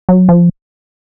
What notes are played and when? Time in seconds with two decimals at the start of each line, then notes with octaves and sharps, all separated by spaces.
0.09 F#3
0.29 F3